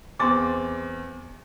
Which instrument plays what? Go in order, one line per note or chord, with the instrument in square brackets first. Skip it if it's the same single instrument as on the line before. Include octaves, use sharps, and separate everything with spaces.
[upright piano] E2 C4 A6 [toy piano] C6 D6